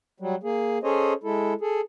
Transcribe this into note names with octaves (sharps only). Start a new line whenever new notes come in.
F#3 G3
A#3 G#4
C#4 G#4 A4 C5 C#5 D#5
G#3 E4 A4
G#4 A4